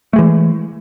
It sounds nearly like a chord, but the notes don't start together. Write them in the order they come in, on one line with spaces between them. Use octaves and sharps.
A3 G#3 E3